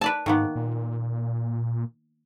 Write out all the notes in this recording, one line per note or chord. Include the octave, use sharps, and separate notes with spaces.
B4 D5 A5
G#2 D#3 A#3 B3
A#2